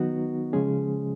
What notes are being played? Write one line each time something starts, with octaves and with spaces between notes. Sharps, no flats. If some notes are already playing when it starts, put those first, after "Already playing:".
Already playing: D#3 F#3 B3 D#4 F#4
C#3 F3 G#3 C#4 G#4